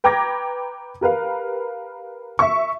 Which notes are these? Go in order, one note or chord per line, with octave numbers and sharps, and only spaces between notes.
B4 G5 A#5 D6 G#6 A#6
G4 A#4 B4 F5
E5 C#6